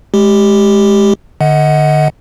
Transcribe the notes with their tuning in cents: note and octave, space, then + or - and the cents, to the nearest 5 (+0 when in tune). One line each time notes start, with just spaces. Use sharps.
G#3 +15 G4 +0
D3 +30 D#5 +25 F#5 +0